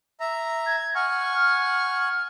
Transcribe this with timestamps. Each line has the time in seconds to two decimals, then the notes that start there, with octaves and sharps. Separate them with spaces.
0.20 E5 A#5
0.66 G#6
0.95 F#5 G#5 C#6 F6